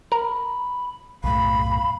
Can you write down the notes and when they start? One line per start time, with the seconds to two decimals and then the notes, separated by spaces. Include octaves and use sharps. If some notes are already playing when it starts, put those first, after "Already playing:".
0.12 A#4 B5
1.24 B1 F#2 A2 F5 B5